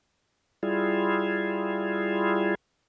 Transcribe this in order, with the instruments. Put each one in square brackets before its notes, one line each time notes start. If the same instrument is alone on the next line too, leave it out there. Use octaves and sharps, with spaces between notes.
[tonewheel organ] G3 E4 F4 G#4